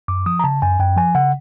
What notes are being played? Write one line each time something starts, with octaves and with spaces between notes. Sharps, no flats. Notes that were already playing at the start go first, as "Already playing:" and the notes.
F#2 D6
F3 D#6
A#5
C#3 A5
F#2 G#5
F#2 G5
F3 G#5
C#3 F#5